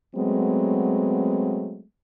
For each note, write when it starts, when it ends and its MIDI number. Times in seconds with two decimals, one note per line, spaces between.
0.16 1.82 54
0.16 1.82 56
0.16 1.82 57
0.16 1.82 59
0.16 1.82 60